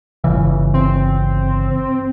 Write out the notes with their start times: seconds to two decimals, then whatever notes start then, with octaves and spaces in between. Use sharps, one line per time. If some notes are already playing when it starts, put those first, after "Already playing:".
0.24 G1 C#3 E3
0.74 C4